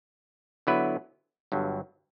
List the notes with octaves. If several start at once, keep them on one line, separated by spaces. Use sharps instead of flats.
D3 F#3 B3 E4 B4
G1 G2 F#3